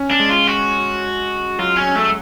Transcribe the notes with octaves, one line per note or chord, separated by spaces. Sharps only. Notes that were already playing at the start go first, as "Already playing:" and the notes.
Already playing: C#4
D4
G#3
F4
F#4
F#3 F4
C#4
A3